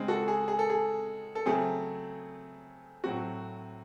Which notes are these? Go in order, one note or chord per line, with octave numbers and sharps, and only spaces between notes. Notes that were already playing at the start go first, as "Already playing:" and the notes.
Already playing: C#3 G#3 C4
F#4 A4
G#4
G#4
A4
G#4
A4
C#3 F#3 A3 C4 G#4
A2 F#3 C4 F#4